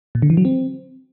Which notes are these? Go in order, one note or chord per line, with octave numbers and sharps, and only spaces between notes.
A#2
D3
E3
F#3
C4